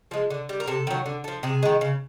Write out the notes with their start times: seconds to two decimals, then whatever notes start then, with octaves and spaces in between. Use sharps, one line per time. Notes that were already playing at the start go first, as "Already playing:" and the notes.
0.11 F3 G#3
0.30 D3
0.49 G3
0.60 A#4
0.67 C3 A4
0.87 D#3 F#3
1.06 D3
1.24 F3 A3
1.43 C3 G#4
1.63 D#3 G#3
1.81 C#3